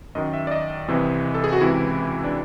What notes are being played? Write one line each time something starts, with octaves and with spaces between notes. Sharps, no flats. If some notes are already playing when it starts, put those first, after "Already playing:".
F#2 D#3 D#5
E5
D5
D#5
C2 C3 E3
A4
G#4
F#4
C#2 C3 E3 E4
D4